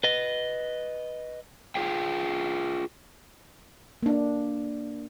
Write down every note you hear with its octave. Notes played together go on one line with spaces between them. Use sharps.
B4 D#5
F4 G#4 G5
A#3 D4